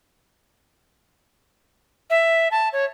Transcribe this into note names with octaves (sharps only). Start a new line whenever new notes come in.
E5
A5
C#5